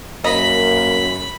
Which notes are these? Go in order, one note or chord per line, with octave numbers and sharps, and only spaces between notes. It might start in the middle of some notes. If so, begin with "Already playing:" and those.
F#2 A#3 D#5 B5